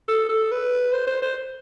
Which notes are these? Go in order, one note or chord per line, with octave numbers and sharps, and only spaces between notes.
A4
A4
B4
C5
C5
C5